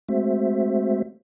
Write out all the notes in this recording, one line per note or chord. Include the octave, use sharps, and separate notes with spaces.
G#3 A3 C4 F#4 C5 E5